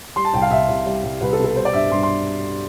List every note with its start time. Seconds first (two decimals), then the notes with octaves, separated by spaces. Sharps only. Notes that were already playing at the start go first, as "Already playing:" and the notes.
0.16 G3 C6
0.25 A5
0.33 C2 G5
0.42 F5
0.51 C2 E5
0.69 C2
0.86 G3
1.04 C2
1.21 C2 B4
1.33 A4
1.39 B2
1.44 A4
1.56 G3 C5
1.65 D5
1.73 G2 E5
1.92 G2 C6
2.03 C6